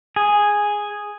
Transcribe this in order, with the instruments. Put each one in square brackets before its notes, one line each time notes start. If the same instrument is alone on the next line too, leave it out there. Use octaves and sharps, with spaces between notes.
[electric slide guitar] G#4